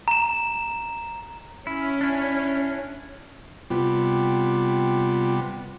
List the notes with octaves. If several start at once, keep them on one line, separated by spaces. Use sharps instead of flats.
A#5 E7
C#4 E4
D4 E4
C3 G3 B3 F4